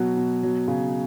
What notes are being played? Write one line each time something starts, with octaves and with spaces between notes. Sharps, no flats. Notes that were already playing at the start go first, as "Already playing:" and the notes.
Already playing: B2 F#3 F#4
B2
F#3
C#3